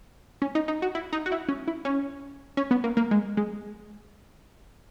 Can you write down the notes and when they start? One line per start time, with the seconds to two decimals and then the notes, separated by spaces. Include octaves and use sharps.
0.42 C#4
0.55 D#4
0.68 D#4
0.82 F#4
0.95 E4
1.13 D#4
1.26 F#4
1.32 E4
1.48 C#4
1.68 E4
1.85 C#4
2.57 C#4
2.71 B3
2.84 A#3
2.97 A#3
3.11 G#3
3.37 G#3